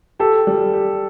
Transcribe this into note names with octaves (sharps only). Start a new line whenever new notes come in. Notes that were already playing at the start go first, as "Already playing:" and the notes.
G4 A4
G3
G4